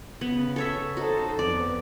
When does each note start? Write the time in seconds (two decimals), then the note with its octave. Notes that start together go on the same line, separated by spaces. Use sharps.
0.21 C#3 B3
0.56 A4 C#5 E5
0.97 D#4 F#4 A4 C5
1.39 F2 B3 D5